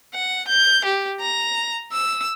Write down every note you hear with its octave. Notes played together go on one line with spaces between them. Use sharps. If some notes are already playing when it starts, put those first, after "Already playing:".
F#5
G6
G4
A#5
E6